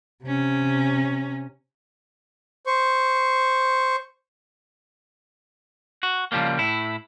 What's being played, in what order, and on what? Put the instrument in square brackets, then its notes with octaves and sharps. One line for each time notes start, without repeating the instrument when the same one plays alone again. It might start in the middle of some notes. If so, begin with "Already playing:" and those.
[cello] C3 C#4
[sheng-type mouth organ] C5 C#6
[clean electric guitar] F#4
C#3 F3 G3 A#3
A2 E4